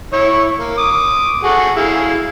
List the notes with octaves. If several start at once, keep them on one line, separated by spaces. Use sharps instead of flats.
E4 C#5
A#3
D6 D#6
F#4 G#4 A4
E4 G#4 F5